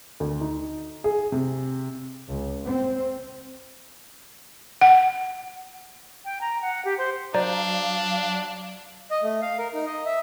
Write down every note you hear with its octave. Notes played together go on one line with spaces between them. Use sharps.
D2
D#4
G#4
C3
C#2
C4
F#5
G5
A#5
F#5
G4
C5
F#3 D4 C5 D5 F5 A#5
D#5
A3
F5
A#4
D#4
D#5
E5